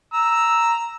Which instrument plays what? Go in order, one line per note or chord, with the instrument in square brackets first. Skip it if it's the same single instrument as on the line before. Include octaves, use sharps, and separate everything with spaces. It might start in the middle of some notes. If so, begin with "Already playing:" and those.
[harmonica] A#5 E6